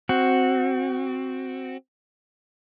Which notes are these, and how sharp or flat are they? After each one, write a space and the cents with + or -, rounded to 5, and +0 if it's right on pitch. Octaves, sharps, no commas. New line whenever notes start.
C4 +0 F#4 +0